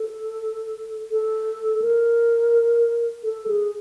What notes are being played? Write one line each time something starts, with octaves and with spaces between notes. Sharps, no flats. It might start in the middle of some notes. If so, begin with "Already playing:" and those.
Already playing: A4
A4
A#4
A4
G#4